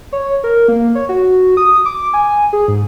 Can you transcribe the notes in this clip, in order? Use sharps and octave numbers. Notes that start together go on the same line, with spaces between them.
C#5
A#4
A#3
C#5
F#4
D#6
D6
G#5
G#4
G#2